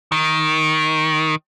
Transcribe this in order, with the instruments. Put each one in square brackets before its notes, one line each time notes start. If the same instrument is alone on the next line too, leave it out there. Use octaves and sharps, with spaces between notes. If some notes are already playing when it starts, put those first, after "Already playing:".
[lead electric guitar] D#3